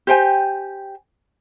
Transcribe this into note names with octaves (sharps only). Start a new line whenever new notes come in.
G4 C5 G5 G#5